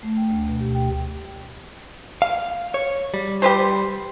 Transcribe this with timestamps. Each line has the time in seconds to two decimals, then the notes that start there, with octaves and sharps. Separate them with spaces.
0.03 A3
0.17 G5
0.31 D2
0.48 B2
0.60 G4
0.75 G5
2.22 F5
2.74 C#5
3.14 G3
3.42 G4 B4 C5